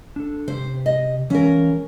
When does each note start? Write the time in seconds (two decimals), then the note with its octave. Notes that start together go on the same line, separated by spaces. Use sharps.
0.16 D4 A4
0.48 C3 G4 C5
0.86 D#5
1.30 E3 G#3 C#4 A#4 F5